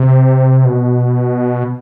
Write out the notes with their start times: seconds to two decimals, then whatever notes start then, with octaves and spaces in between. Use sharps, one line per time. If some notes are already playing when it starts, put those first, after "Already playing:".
Already playing: C3
0.65 B2